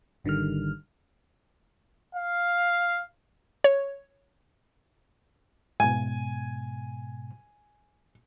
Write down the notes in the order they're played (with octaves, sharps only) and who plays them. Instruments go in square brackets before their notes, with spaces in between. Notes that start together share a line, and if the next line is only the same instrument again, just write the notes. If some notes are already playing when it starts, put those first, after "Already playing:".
[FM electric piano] G#1 D3 D#3 G3 F6
[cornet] F5
[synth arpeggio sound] C#5
[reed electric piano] G#2 B2 [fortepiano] G#5